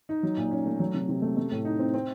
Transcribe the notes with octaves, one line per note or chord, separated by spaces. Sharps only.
D#4
F#3
A#2
C#4
A3
F#3
C3
C3
A3
A3
A2
D#4
C4
C4